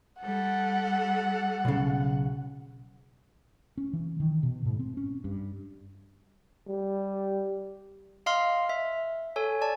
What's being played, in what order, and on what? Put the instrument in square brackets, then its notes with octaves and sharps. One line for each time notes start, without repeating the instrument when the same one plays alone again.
[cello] G3 A4 [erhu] F#5
[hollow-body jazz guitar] B1 C#3
[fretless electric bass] C#4
E3
D#3
B2
G#2
C4
C#4
G2
[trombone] G3
[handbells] D#5 F5 C6 F6
E5
A4 C#5 G#5
D5 A5